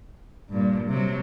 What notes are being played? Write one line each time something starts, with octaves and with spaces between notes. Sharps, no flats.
G2 A#2
C3 F#3